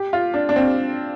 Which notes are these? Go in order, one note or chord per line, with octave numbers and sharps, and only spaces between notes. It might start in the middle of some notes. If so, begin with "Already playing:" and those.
Already playing: G4
F4
D4
D4
C4